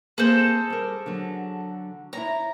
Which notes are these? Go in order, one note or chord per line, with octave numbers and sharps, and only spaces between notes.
A#3 C4 G#4 A4 C5
G3 A#4
D3 F#3
E4 C#5 A#5